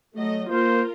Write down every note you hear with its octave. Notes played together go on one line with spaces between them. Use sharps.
F#3 A3 D#5
A#3 F4 A#4 C5